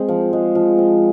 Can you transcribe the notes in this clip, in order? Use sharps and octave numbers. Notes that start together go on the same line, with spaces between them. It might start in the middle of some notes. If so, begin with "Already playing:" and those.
Already playing: G#3 C4
F3
G#3
F3
C4